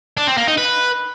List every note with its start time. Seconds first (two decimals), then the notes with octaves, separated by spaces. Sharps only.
0.17 D4
0.27 C4
0.37 A#3
0.47 D#4
0.58 B4